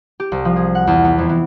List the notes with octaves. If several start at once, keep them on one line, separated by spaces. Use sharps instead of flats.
G4
C2
F3
G#4
F#5
E2
B3
F2
E3